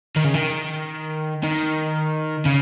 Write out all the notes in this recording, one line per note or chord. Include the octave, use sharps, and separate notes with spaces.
D#3
C#3
D#3
D#3
C#3